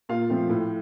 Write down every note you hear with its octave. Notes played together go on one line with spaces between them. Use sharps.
A#2 F4 F5
F3 A3 C4
A2